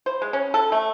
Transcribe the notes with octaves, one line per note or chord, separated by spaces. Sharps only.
C5
G#3
C#4
A4
A3